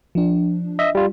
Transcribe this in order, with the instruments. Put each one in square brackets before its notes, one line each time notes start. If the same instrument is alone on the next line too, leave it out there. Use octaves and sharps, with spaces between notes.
[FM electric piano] F3 D4
[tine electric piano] D#5 E5
G3 F4